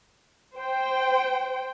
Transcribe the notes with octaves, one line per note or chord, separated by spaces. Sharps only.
C5 G5